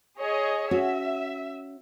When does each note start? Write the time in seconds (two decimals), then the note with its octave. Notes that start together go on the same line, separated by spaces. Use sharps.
0.21 G#4 C#5 D#5
0.71 C#4 F#4 E5